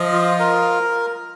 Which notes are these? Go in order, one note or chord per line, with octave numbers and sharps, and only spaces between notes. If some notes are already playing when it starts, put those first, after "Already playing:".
Already playing: F3 D#5
F4
A#4